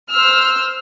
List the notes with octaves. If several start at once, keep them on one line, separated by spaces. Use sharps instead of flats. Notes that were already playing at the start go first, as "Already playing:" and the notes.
C5 E6 F6